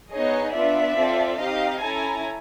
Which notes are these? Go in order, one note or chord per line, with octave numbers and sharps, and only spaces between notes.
B3 D#4 G#4 C#5 D#5
B3 D4 F4 D5 E5
C4 F4 A4
C4 D#4 G4 D#5 F5
C#4 E4 A4 G#5 A#5